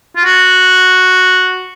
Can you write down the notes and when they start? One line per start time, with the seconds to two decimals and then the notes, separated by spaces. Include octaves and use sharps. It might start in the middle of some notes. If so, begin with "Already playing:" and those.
0.16 F4
0.25 F#4